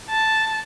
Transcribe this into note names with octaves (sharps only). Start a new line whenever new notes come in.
A5